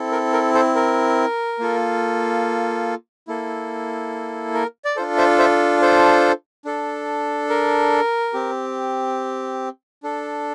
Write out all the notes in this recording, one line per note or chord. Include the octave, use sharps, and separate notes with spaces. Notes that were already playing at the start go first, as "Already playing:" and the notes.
Already playing: C4 E4 A4
A#4
A#4
A4 C5
A#4
A#3 F4 A4
A#3 E4 A4
A#4
D5
D4 F4 A4 C5
C5 E5
C5 E5
A4 C5
D4 A4
A#4
C4 G4
D4 A4